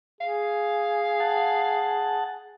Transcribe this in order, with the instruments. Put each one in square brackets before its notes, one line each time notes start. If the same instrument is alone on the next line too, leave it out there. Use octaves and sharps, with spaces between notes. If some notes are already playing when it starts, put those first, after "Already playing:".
[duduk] G#4 [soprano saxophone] F5
[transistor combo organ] F#5 A5